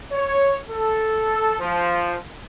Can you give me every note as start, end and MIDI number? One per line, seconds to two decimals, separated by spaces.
0.13 0.57 73
0.70 1.56 69
1.61 2.17 53